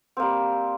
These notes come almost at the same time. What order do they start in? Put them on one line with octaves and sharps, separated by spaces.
C4 A#3 G3